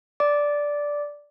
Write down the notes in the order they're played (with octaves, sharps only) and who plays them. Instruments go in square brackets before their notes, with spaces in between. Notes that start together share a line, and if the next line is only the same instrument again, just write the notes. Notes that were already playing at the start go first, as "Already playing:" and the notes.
[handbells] D5 D6